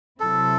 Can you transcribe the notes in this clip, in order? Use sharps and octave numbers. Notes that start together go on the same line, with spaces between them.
C3 F#3 C4 E4 A4